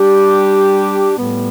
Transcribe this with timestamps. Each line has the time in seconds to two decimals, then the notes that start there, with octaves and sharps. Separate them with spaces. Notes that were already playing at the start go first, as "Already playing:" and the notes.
Already playing: G3 D4 G4
1.17 A2 G3 B3